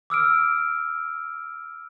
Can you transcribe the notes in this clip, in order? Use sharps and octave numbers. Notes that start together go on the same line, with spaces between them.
D6 E6 F6 D7